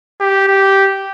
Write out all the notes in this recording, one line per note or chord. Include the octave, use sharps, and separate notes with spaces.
G4
G4